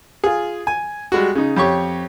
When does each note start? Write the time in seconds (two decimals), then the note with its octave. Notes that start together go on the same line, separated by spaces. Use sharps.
0.24 F4 G#4
0.67 G#5
1.12 G3 G#3 F#4
1.35 C#3 D#4
1.56 F2 G4 C#5 C#6